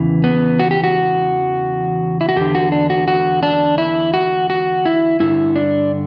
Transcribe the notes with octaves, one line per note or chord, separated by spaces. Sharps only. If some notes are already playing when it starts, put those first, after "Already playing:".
Already playing: E2 C#3 E3
B3
F#4
G4
F#4
E4
F#4
E2 D3 G4
F#4
D4
F#4
F#4
D4
E4
F#4
F#4
E4
G2 D3 E4
D4